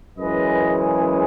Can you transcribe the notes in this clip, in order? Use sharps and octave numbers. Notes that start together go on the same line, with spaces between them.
F#2 C#3 E3 G#3 B4 D#5